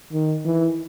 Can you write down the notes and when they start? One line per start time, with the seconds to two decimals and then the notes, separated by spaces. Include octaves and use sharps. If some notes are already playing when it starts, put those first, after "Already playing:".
0.13 D#3
0.45 E3